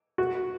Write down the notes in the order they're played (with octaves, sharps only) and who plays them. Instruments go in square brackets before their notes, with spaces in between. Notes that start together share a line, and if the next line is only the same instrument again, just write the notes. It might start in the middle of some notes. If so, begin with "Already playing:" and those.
[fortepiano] F#4